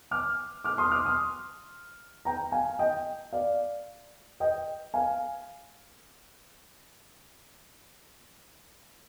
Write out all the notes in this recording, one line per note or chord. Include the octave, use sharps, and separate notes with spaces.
D6 F6
D6 F6
C6 D#6
D6 F6
C6 D#6
G5 A#5
F5 G#5
D#5 G5
D5 F5
D#5 G5
F5 G#5